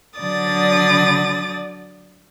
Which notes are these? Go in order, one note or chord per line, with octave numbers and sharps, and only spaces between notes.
D3 F#3 D5 D#6 A6